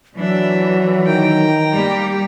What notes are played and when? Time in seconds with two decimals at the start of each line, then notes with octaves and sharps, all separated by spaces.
0.16 E3 F#3 D4 E5
1.06 D#3 G5 A#5
1.73 G3 A#3 G4